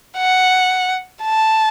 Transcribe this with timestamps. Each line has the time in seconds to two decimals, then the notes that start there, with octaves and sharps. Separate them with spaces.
0.17 F#5
1.23 A5